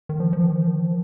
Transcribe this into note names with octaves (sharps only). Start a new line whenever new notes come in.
D#3
F3
F3
D#3
F3
D#3
F3